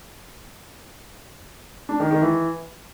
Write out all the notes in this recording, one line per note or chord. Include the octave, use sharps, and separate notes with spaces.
D4
D#3
D#3
E3